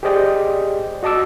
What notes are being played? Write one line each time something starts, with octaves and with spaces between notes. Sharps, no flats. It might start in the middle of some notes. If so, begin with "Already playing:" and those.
G4 G#4 C5 D5 D#5 G5
F#4 D#5 A5 D6 E6